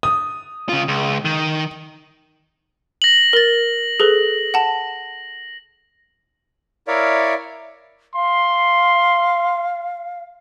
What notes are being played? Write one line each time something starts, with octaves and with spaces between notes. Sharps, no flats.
D#6
C#3 F4
C#2
D#3
A#6 F#7
A#4 A6
G#4 A4 B4
F#5 A5
E4 A#4 C#5 D5 E5 F5
F5 C6